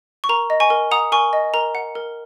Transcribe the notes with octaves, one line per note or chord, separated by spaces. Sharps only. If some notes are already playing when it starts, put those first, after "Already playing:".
C#6
A#4 A#5
D#5
G#5 C#6
A#4
F#5 A#5 D#6
A#4 G#5 C#6
D#5
A#4 A#5
F#5
A#4